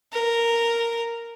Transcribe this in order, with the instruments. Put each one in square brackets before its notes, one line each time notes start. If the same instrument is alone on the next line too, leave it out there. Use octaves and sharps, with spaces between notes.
[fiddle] A#4